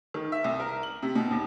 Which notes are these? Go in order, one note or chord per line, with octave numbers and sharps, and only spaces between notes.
D#3
E5
C2
A#4
F#7
C3
B2
D#2